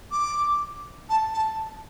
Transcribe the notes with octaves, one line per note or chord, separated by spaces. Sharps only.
D6
A5
A5